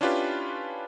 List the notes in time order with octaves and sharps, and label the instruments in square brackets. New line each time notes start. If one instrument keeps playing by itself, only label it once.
[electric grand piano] C#4 D4 E4 F4 G4 B4